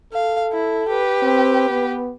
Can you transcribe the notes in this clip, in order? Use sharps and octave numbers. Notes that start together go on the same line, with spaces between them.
A4 F5
E4
G4 B4
C4
B3